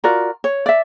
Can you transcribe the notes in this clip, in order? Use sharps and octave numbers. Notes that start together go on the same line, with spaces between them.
F4 F#4 A#4 D5
C#5
D5 E5